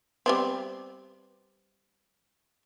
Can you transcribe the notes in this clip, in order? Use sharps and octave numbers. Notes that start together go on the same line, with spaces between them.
G3 B3 C4